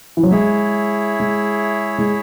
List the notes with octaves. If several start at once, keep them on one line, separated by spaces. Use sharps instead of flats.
E3
F#3
G#3 E4 G#4 C#5 E5
G#3
G#3